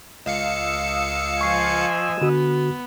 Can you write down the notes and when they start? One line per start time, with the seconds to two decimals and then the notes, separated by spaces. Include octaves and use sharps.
0.26 C#2 D#5 F5 E6 C#7
1.41 F3 G#5 C#6 C7
2.22 D3 B3 F#4